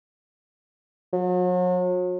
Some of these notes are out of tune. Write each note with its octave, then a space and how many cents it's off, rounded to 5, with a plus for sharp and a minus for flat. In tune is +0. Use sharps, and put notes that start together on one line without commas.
F#3 -40